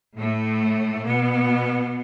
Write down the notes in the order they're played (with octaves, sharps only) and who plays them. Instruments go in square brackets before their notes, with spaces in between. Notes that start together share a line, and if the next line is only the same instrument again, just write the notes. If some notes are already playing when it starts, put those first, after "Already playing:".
[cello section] A2 A3
B2 B3